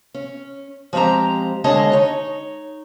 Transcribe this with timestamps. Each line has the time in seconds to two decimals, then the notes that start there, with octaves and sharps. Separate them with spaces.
0.14 C#4
0.93 F3 G#3 C4 G4 A#5
1.64 D#2 D3 G#3 C#5 D#5 A5
1.92 D#4 C#5